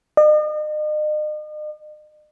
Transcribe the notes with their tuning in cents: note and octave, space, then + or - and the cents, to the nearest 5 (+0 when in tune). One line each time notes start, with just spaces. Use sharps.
D#5 -45